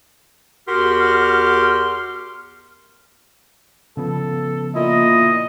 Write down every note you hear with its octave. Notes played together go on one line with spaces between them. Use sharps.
E2 F#4 G4 A#4 C6 F6
C#3 F3 B3 A4
A#2 E4 D#5